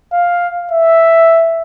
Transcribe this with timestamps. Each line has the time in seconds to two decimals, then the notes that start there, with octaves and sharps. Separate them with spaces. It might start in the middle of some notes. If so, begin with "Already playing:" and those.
0.12 F5
0.71 E5